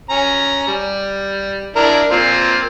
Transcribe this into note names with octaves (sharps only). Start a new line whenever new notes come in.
C#4 A#5
G3
D4 E4 A#4
A#3 C4 F4